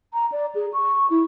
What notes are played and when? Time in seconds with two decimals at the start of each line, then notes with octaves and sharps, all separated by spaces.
0.14 A#5
0.32 D5
0.55 G#4
0.73 C#6
1.10 E4